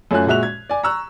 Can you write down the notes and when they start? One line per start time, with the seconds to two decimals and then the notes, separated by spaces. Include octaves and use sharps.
0.11 F#2 A3 C#4 F4 G#5 F#6
0.27 A#2 G#3 F#4 E5 F#6 F7
0.43 G#6
0.69 D5 G#5
0.83 A#5 C#6 E6 F#6